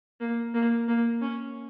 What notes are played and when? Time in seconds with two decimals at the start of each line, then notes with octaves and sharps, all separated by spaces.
0.20 A#3
0.54 A#3
0.88 A#3
1.22 C#4